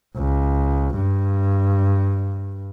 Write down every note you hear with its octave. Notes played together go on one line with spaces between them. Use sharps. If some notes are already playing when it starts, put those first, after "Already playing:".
C#2
G2